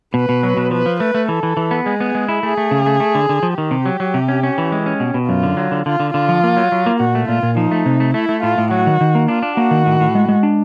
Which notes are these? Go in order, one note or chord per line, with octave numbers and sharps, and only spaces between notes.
B2 B4
B2
F#3
B2
F3 B4
F3
A3 B4
A3
E3 A4
E3
E3
B3
G#3 G#4
B3
G#3
E4
A3 G#4
A3
C#3
A3
A3
D3
D3
F3
D#3 G4
C3
F#3
F#3
C3
C#4
C#4
E3
G#3
C#4
B2
B2
F#2 F4
D3
F#3
D3
D3 F4
D3
D3 F4
F3
A#3
F#3
F#3
A#3
A#2 F#4
A3
A#2 F4
A#2
F3 D#4
A3
C3
A3
A3 E4
A3
A2 F4
A2
F#3 F#4
D#3
D#3
A#3
D4 F4
D4
A#3 F#4
D#3
A2
A2
G#3
G#3
D4